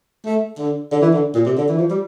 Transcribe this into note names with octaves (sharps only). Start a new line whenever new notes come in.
A3
D3
D3
E3
D3
A#2
C3
D3
E3
F3
G3